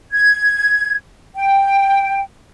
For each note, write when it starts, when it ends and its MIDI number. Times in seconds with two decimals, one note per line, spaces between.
0.13 0.95 92
1.35 2.22 79